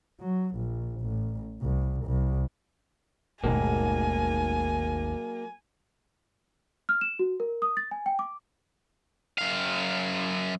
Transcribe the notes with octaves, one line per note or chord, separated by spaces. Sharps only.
F#3
A#1
A1
C2
C2
G#1 D#2 G#2 B2 F#3 A3 A#3 G#5
F6
E7
F#4
A#4
D#6
A6
G#5
G5
D6
F#2 F5